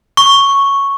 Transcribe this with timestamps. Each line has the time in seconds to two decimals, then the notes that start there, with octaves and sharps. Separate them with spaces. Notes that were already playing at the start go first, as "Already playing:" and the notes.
0.17 C#6